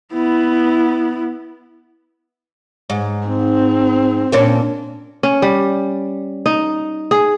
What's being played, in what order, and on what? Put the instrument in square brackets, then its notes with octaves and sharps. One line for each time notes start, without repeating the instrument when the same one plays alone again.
[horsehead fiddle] B3 E4
[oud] G#2
[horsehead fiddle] C4
[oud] A#2 C#4 D4
[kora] C#4
G3
D#4
G#4